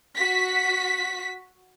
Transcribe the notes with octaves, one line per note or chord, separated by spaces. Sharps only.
F#4 B6